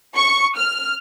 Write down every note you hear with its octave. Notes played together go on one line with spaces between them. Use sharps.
C#6
F6